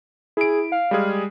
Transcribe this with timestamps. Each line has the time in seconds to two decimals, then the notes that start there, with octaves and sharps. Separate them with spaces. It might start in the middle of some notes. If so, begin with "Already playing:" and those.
0.37 E4 G#4 D7
0.72 F5
0.91 G3 G#3 G#4